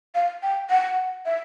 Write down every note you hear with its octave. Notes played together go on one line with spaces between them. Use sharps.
F5
G5
F#5
E5